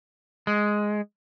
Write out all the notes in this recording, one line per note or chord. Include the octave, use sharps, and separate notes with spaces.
G#3